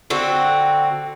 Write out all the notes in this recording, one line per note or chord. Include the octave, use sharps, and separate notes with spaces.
D3 C4 F#4